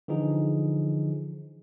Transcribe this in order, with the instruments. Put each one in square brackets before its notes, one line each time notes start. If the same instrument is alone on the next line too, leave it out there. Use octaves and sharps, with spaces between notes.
[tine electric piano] D3 E3 F3 D#4 G#4